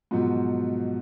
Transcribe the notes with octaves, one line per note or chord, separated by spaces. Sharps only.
G#2 B2 F3 F#3